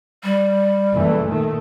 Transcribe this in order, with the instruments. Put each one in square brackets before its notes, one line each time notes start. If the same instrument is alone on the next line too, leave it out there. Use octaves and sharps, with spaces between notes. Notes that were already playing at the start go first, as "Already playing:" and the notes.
[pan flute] G3
[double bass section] F#1 E3 A3
A#2 D#3 A3